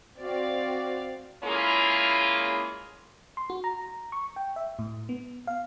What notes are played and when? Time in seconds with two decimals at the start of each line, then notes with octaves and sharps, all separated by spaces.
0.20 C4 F#4 D5 F5
1.44 G#3 A#3 C#4 E4 F4 G#4
3.37 C6
3.50 F#4
3.64 A#5
4.12 C#6
4.36 G5
4.56 E5
4.79 A2
5.09 B3
5.47 F5